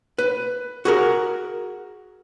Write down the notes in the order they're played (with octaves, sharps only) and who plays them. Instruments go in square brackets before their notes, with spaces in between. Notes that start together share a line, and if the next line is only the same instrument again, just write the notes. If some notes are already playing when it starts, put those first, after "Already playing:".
[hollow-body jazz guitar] B4
F#4 G#4 A#4